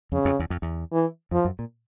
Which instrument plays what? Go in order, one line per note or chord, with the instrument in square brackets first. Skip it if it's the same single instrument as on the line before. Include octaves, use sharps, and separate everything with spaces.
[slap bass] F2 [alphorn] C#3
[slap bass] F2
E2
F2
E2
[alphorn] E3
[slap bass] F2 [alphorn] F3
[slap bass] F#2
A#2